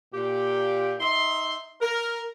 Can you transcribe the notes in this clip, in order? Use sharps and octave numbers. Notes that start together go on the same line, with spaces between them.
A#2 G4
D#4 E5 C6
A#4